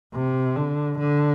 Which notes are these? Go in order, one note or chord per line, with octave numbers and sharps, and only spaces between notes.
C3
D3
D3